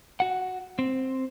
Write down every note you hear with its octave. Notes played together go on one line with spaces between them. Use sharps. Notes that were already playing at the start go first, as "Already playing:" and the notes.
F#4 F#5
C4